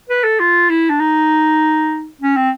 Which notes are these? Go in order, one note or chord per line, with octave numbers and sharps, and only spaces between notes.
B4
A4
F4
E4
D4
D#4
C#4
C4